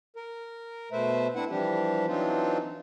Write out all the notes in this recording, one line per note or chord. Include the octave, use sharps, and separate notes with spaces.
A#4
B2 A3 B4 C5 E5
C4 D4 E4 B4 F#5
E3 F3 G3 D4 G4
E3 F#3 C4 D4 D#4 F4